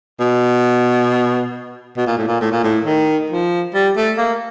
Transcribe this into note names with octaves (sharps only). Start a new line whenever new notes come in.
B2
B2
A#2
A2
A#2
A2
A#2
A2
D#3
F3
G3
A3
A#3